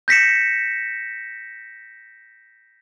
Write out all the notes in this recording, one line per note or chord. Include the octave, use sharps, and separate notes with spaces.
G6 A#6 B6 C#7 E7